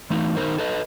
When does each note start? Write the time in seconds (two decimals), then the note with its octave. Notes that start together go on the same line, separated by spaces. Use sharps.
0.10 E3 A3 D#4
0.37 D#3 G#3 D#4 A#4 C5
0.58 A4 B4 D#5